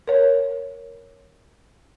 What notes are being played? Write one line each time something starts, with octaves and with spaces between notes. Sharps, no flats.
A#4 C#5